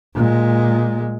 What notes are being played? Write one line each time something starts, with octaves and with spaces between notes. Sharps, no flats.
A#2 G#3